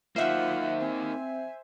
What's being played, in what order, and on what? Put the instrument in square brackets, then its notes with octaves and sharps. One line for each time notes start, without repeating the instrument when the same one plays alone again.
[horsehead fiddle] F#3 F#5 [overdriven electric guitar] A#3 D#4 [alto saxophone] F4 [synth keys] C5 E5
[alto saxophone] C4 [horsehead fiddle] G#5